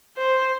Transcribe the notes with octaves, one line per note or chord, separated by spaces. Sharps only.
C5